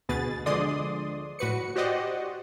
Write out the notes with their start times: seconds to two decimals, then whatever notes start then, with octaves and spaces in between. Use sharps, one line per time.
0.09 D2 B2 G#4 B4 A6
0.46 D3 F3 G#3 D5 C6 D#6
1.39 A2 F#4 B4 C#7
1.76 F#4 G4 C5 D5 D#5 F#5